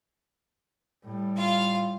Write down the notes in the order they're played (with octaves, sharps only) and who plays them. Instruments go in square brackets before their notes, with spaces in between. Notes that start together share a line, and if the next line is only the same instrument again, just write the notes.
[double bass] A2 G3
[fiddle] F4 F5